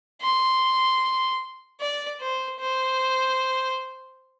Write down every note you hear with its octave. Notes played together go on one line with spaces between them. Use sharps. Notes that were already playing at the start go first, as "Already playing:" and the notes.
C6
D5
C5
C5